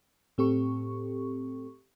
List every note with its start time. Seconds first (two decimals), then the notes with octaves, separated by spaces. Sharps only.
0.38 A2 C4 G4 A4 C#6